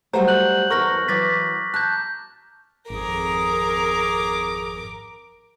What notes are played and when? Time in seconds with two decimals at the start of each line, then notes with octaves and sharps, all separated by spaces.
0.13 F#3 G3 A3 C5 F#5 A#5
0.28 F#6 G6 F#7
0.70 E2 A4 A#4 C#6 F6 A#6
1.08 E3 F#3 D6 A6 B6
1.74 A5 F#6 G6
2.90 G#1 F2 G#4 A#4 D6